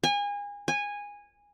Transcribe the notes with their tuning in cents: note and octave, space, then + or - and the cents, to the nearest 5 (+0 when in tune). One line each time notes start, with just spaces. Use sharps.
G#5 -30
G#5 -15